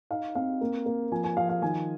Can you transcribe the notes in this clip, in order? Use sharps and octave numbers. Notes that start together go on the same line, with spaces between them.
D#4 F5
C4 F5
A#3
A#3
F3 G#5
G#5
F3 F5
F5
D#3 G#5